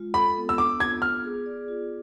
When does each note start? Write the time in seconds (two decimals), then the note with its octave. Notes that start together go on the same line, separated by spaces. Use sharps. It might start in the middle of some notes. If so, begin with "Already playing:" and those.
Already playing: G#3 F4
0.14 A4 B5
0.37 B3
0.49 E6
0.58 D4 D6
0.80 F4 G#6
1.01 B3 F6
1.24 G#4
1.46 D5
1.68 F4